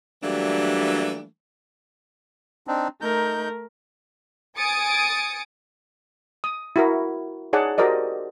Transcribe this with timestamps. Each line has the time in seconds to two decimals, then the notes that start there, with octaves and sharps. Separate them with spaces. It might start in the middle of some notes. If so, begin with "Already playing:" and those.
0.23 E3 F#3 G3 A3 A#3 D4
2.67 C4 D4 D#4
3.02 A3 D#4 A#4 G6
4.56 G#5 D#6 A6 C#7 D7
6.44 D#6
6.76 E4 F#4 A#4
7.53 D#4 G#4 C#5 D5 F#5 A5
7.78 F#4 G4 A#4 C5 D5 D#5